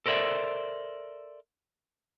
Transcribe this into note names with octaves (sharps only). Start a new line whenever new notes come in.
A4 A#4 C5 D5 E5